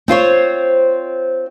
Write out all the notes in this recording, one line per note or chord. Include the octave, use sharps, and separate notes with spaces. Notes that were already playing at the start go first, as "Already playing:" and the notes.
C4 F4 C5 C#5